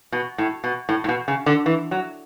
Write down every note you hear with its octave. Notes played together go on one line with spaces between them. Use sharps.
B2
A2
B2
A2
A2
B2
C#3
D3
E3
F#3